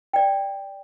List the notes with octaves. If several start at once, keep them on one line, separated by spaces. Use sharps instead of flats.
D5 G5